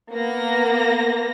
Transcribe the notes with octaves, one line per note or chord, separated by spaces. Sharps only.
A#3 B3 A#6